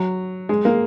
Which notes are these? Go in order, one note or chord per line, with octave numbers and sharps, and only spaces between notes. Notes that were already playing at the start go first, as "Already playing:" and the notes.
Already playing: F#3
G#3
A#3